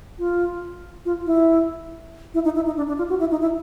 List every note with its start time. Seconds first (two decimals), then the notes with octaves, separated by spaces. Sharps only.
0.19 F4
1.05 F4
1.26 E4
2.34 E4
2.45 D#4
2.56 E4
2.66 D#4
2.77 D4
2.88 D4
2.98 F4
3.09 F#4
3.20 E4
3.31 D#4
3.41 E4